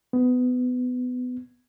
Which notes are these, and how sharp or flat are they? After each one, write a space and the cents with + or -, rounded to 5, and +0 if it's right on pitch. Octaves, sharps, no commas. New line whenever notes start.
B3 +20